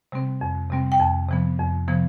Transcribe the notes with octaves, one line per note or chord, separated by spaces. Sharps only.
C3 G3 C4
F2
C3 G3 C4
G5
F2 A5
C3 F3 B3
F2
C3 F3 B3